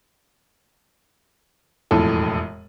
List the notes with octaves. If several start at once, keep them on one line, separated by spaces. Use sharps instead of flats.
E1 F2 A2 A4